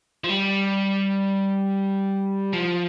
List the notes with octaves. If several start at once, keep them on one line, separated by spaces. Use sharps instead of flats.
F3
G3
F3